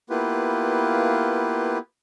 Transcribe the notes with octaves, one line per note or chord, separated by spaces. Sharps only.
A#3 B3 E4 F4 G4 B4